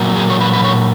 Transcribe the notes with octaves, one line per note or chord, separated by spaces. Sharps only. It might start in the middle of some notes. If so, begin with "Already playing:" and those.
Already playing: A#2 F#3
G#4
C#5
B4
B4
C#5